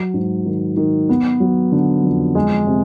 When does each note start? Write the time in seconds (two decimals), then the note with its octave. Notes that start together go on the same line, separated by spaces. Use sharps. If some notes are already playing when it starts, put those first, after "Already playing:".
Already playing: F#3
0.14 G#2
0.45 D#3
0.77 D#3
1.09 B3
1.40 F#3
1.72 D3
2.04 F2
2.35 G#3
2.67 C3